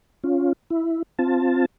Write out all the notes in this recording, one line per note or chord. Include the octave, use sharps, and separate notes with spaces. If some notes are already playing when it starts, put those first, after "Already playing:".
C#4 F4
E4
C4 F4 A5